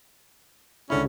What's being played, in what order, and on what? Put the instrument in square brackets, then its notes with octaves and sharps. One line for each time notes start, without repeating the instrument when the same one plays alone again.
[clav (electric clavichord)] C#2 D3 E4 [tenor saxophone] C#4